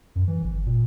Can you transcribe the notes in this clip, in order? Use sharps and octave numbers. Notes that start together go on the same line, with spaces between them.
F#2
E3
G1
A#2